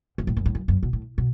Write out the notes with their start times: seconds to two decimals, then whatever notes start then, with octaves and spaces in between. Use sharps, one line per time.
0.18 F#2
0.27 A2
0.37 F#2
0.46 A2
0.55 F#2
0.68 F#2
0.83 B2
0.93 A2
1.18 B2